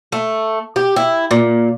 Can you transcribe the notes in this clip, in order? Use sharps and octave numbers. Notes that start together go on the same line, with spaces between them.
A3
G4
E4
A#2